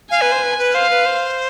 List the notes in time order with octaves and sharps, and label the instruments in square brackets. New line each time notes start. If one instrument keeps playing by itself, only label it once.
[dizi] F5 [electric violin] G#5
[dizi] B4
C5
B4
B4
[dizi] C5 [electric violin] F5
[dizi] B4
C5